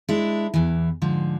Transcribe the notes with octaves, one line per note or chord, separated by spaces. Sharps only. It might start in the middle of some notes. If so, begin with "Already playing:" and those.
G#3 D4 E4
E2 E3
G#2 D3 F3